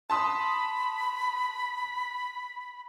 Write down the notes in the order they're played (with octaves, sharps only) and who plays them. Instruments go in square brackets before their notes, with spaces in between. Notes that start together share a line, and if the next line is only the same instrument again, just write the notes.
[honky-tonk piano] A5 C6 D#6 [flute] B5